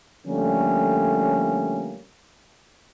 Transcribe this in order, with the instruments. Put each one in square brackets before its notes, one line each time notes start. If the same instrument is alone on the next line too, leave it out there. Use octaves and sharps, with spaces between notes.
[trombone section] D3 F3 G3 A3 A#3 C#4